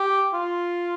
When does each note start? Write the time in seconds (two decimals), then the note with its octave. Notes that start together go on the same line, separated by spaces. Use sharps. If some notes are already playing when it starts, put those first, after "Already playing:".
Already playing: G4
0.34 F4